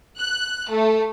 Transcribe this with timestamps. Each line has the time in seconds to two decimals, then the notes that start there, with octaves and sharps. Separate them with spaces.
0.17 F#6
0.69 A3